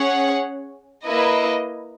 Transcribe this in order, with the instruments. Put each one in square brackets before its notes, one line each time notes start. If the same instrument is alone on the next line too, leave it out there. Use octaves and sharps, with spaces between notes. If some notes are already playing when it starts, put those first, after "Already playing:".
Already playing: [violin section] C#4 G#4 C#5 F#5
A#3 E4 B4 D#5